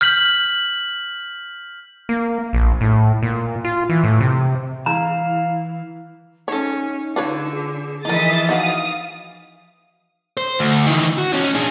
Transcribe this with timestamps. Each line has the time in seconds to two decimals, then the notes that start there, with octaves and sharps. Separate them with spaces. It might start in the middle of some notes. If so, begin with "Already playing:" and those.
0.01 F6 G6 B6 F#7
2.09 A#3
2.53 A#1
2.81 A2
3.23 A#2
3.65 F4
3.90 E3
4.04 A2
4.20 C3
4.86 E3 F5 A#5
6.48 C#4 D#4 A4 C#5
7.16 D3 F4 B4 C#5
7.52 G#4
8.05 E3 F3 D#4 E4 A#4 D#5 D#6 A6
8.49 D#4 F#4 B4 F5 D#6
10.37 C5
10.59 D2
10.87 D#3 E3
11.18 F#4
11.33 C#4 D#4
11.55 D4 G#4